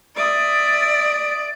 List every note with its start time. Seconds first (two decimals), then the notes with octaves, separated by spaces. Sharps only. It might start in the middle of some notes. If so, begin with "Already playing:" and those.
0.16 D5 E5 D#6